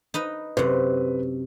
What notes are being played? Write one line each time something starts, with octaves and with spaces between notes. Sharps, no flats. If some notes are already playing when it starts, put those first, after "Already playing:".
D#4 B4 D#5
F#2 C3 B4